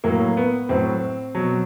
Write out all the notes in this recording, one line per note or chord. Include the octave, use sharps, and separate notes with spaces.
A2 F#3 A#3
B3
A2 F#3 C4
B2 F#3